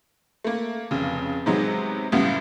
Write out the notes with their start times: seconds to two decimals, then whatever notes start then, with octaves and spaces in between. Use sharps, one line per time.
0.44 A3 A#3
0.91 F1 C#3
1.46 C3 D#3 F#3 G#3 B3
2.12 C#2 F#2 A2 G3 B3